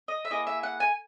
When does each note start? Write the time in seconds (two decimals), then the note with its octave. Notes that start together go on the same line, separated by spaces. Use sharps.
0.08 D#5
0.25 E5
0.30 A#3 E4 G#4 D#5
0.47 E5
0.63 F#5
0.80 G#5